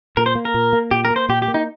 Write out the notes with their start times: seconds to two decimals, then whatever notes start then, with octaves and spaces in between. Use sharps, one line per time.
0.17 A#2 A#4
0.26 C5
0.35 A#3
0.45 A#4
0.54 A#2
0.73 A#3
0.91 A#2 G4
1.05 A#4
1.10 A#3
1.16 C5
1.29 A#2 G4
1.42 G4
1.48 A#3
1.54 D#4